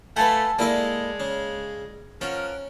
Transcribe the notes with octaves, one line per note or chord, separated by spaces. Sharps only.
A3 A4 B4 F5 F#5 G#5 A5 C7
G#3 A#3 E4 A4 D5 D#5
C#3
F3 C#4 A#4 F#5